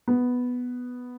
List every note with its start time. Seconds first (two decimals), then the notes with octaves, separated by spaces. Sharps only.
0.08 B3